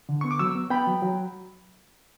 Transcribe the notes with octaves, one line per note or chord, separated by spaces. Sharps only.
D3
B3 C#6
D6
F#3 C#6 E6
B3
B3 G5 B5
F#3
F#3